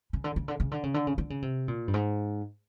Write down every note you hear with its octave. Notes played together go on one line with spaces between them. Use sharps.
C#3
D3
C#3
D3
C#3
D3
C#3
D3
C#3
D3
C#3
C3
A#2
G2
G#2